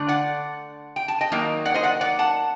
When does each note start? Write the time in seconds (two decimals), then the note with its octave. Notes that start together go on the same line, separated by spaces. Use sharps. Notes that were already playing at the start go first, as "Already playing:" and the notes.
Already playing: D3 A3 D4
0.08 D5 F#5
0.96 G5
1.08 A5
1.21 D#5 G5
1.32 D#3 F#3 A#3 D#4
1.65 D5 F#5
1.74 C5 D#5
1.83 D5 F#5
2.01 D5 F#5
2.19 F#5 A5